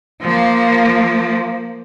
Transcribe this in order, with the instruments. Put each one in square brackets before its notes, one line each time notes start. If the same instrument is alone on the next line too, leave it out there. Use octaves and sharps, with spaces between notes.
[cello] F3 A#3